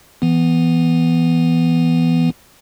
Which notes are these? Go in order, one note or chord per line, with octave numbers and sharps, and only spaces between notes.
E3 B3